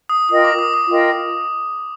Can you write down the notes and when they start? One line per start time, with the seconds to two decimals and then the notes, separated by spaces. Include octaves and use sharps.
0.09 D#6
0.29 F4 A#4 D#5 G5 D#6
0.44 D6
0.59 D#6
0.74 D#6
0.89 F4 A#4 D#5 G5